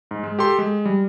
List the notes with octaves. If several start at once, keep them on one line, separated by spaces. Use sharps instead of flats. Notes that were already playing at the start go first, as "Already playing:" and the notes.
G#2
G#3
G4 A4 C6
G#3
G3